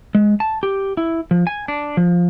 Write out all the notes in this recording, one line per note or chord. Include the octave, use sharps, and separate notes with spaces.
G#3
A5
G4
E4
F3
G#5
D4
F3